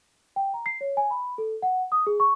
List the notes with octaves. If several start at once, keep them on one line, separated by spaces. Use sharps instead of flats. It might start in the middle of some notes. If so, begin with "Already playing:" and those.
G5
A#5
C7
C#5
G#5
B5
A4
F#5
D#6
G#4
C#6